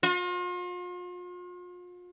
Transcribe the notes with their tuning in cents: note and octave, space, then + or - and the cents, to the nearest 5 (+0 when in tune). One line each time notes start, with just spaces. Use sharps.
F4 +40